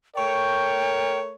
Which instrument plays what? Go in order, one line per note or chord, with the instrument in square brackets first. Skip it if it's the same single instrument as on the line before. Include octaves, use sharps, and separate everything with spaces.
[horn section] A3 A#4 C#5 [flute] G5